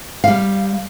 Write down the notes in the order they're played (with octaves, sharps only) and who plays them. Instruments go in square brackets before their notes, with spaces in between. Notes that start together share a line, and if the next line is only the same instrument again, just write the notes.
[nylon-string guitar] G3 F5